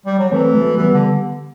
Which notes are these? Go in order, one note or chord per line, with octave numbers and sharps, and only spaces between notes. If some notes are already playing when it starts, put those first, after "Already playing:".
G3
F#3
E3 A3 C4
F#3 A3
E3 G3 B3
D3